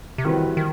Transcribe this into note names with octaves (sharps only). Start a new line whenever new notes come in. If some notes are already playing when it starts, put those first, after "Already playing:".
C3
D#3 E3 G3 C4 F#4 B4
D#3